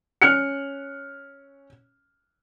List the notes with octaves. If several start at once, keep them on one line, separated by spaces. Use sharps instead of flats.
C#4 F6 F#6 C#7